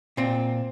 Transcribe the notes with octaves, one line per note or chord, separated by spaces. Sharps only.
A#2 C4